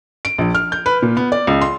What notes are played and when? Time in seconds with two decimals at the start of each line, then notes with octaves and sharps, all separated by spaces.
0.25 D7
0.38 A#1
0.55 F6
0.72 G6
0.86 B4
1.02 A#2
1.17 B3
1.32 D5
1.47 C#2
1.61 C6